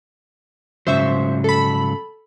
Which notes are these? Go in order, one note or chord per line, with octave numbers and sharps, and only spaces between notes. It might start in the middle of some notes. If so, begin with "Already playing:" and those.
G#2 C#3 F#3 C5 E5 C#6
A4 B5